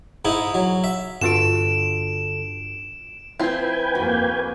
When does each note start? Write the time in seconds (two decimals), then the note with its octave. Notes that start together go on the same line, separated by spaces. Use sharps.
0.25 G#2 D#4 E4
0.54 F#3
0.84 E5
1.21 G2 D3 F4 F#4 A4 D7 E7
3.39 F3 C4 E4 B4 G5 G#5 C6
3.95 F2 A#3 F#4